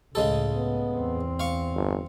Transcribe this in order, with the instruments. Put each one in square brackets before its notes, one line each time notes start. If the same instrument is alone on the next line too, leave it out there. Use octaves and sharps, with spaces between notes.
[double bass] C#2 A2 [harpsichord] C#3 G#3 A4
[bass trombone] B3
[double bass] E2 C4
[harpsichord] F5 C#6
[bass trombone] G1